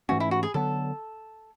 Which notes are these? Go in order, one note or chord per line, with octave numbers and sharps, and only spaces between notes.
G#2 E3 A3 C#4 F#4
E4
F#4
G#4
D3 F#3 B3 A4